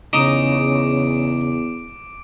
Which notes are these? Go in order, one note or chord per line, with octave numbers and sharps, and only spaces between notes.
E2 C#3 D#4 A#5 D6 D#6 D7